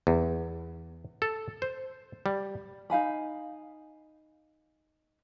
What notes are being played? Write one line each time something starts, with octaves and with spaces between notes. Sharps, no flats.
E2
A4
C5
G3
D#4 F5 G#5 B5